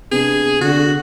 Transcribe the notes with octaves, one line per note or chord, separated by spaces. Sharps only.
C3 B3 D4 G#4
D3 F#4